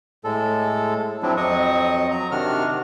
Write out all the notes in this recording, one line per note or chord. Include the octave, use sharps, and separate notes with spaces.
A2 G#3 A4
F3 F#3 C4 D4 E4
F2 F#3 C4 D#5 C#6 D#6
F#3 A#5
C3 D#3 D4 F#4 F6